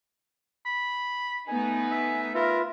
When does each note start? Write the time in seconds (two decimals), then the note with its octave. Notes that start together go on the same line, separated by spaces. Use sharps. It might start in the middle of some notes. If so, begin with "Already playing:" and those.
0.66 B5
1.48 A3 B3 D#4 G#5
1.92 E5
2.35 F4 A#4 B4 E5